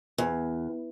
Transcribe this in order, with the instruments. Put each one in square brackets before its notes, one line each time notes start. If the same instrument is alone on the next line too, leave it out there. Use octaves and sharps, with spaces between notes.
[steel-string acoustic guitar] E2